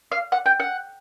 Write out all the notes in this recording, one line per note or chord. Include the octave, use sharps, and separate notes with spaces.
F5
F#5
G5
F#5